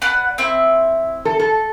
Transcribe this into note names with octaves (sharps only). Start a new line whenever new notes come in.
B4 D5 F#5
C4 E4
A4
A4